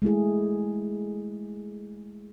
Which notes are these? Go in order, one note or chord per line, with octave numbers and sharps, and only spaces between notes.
G#3 A3 E4 G#4